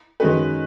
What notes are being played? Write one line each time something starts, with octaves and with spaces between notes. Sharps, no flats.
D#3 G#3 C#4 F#4 B4